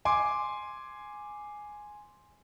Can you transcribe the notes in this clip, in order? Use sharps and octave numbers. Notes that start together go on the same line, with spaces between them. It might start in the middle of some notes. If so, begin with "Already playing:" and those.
G#5 C6 D6